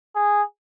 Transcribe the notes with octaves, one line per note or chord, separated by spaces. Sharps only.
G#4